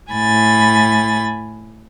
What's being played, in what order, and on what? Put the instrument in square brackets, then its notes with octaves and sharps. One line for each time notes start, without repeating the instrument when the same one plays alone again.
[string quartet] A2 G#5 B5 A6